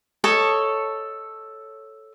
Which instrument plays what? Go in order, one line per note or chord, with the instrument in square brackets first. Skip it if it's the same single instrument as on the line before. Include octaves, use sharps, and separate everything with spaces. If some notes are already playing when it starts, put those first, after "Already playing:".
[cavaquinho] A4 C#5 D#5